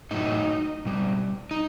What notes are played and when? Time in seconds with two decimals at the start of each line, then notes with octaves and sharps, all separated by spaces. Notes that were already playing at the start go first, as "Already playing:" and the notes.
0.11 A2 F#3 D#4
0.86 B2 G3
1.51 D#4